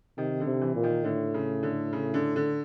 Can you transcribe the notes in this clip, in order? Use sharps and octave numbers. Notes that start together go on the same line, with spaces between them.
C3 D#3
D3
C3
E3
A#2
D#3
A2 D3
C#3
D3
C#3
D3
D3